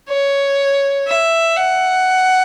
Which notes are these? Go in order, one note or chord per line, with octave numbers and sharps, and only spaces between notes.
C#5
E5
F#5